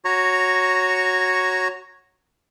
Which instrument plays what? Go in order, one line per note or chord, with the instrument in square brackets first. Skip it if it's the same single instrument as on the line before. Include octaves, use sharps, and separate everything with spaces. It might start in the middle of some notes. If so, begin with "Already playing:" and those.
[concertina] F#4 C#5 A#5 C#6